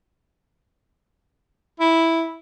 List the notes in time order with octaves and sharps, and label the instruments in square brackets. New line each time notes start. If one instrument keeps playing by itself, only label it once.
[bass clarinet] E4